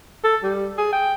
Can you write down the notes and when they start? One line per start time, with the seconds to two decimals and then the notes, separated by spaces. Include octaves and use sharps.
0.24 A4
0.43 G3
0.78 G#4
0.93 G5